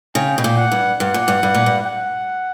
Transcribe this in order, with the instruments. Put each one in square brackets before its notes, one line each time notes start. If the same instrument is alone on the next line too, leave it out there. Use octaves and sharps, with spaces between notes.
[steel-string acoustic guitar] C#3 [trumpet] G5
[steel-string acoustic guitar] B2
A#2
[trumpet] F#5
[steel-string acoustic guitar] G2
[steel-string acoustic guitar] G2 [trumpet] F#5
[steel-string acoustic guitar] A#2
G2
G2
A#2
G2
[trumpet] F#5